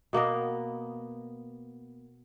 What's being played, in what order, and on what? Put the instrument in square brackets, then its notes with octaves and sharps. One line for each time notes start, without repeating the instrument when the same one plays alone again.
[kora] B2 A#3 B3 A#4